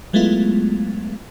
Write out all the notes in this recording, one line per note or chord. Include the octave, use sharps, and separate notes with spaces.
F#3 G#3 A3 B3 E4 F4